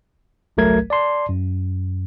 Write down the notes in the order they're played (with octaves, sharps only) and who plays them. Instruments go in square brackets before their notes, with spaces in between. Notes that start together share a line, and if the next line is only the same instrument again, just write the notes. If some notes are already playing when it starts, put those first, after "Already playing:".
[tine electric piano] G1 C2 F#3 A3 A#4 G#6
D5 A5 C6
F#2